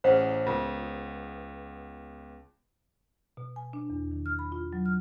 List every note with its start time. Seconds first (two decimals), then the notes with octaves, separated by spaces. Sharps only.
0.04 A1 C#4 G#4 C5 F5 F#5
0.47 C#2 B3 F4 A#4
3.37 B2
3.56 G#5
3.73 D4
3.90 E2
4.11 D#3
4.26 F6
4.39 B5
4.52 F4
4.73 F#3
4.86 F6